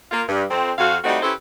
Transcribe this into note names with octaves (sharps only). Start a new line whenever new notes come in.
A#3 F4
G2
F2 C4
F2 F#4 F5
G3 A3 C4 D#4 E4 F#4
C#4 E4 G4 A4 B4 C5